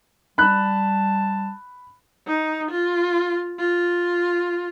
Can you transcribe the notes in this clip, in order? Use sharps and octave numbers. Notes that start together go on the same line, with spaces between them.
G3 A5 B5 F#6
D#4
F4
F4